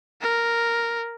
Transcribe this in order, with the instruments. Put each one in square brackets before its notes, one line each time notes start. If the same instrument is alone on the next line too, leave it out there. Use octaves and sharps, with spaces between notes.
[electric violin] A#4